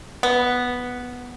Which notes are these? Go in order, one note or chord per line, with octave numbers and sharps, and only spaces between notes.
B3